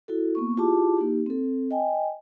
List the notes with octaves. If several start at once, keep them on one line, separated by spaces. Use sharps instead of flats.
E4 F#4 A4
A#3 B3 C#6
E4 F4 G4 G#4 A5 D6
A#3 D#4 G4
C4 A4
D#5 G5 G#5